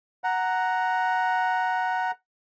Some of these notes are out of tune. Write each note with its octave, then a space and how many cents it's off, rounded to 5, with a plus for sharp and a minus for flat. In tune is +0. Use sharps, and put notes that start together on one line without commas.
F#5 +0 A#5 +0